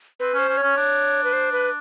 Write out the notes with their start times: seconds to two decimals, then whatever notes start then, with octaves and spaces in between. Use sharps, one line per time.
0.20 C4 B4
0.34 C#4 C5
0.48 C#4
0.57 C#5
0.63 C#4
0.77 D4
1.24 B4
1.33 C5
1.52 B4